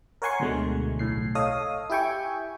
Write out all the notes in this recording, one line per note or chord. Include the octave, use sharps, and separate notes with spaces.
A#4 C#5 F#5 G#5 C6 C#6
D2 B2 D3 G#3 A3
B1 A2 C7
A4 C#5 D#5 F5 D#6
E4 G4 E5 G5 G#5 C#6